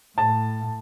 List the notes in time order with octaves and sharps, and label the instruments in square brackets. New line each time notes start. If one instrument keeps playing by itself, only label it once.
[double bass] A2 [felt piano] A5